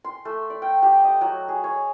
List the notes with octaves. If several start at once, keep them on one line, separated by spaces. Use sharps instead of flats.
C6
A3
D5
G5
G4
D#5
F#3
G#4
C#5